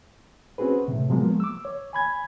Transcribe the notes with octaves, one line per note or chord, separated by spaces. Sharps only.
C4 C#4 F#4 G#4 B4
A2 C3
F3 F#3 G#3 A#3 B3
D6 E6
C#5
G#5 B5 G#6